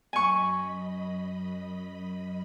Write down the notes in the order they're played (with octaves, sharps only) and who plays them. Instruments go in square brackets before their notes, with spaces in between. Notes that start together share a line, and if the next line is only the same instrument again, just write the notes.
[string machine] F#2 D#5 B5 [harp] G#5 C#6